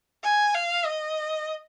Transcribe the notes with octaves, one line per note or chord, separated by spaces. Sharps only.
G#5
F5
D#5